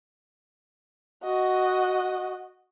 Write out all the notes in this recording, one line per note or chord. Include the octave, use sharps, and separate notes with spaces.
F#4 D#5